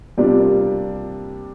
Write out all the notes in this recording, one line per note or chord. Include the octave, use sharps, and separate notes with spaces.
C3 G3 A#3 D4 F4